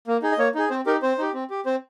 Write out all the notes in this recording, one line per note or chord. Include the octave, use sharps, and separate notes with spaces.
A#3
D#4 G#4
D#5
A#3 C#5
D#4 G#4
C4 C5
D#4 G4 A#4
C4 C5
D#4 G4
C4
G4
C4 C5